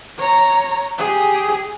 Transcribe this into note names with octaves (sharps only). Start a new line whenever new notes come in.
C#5 A#5
G4 G#4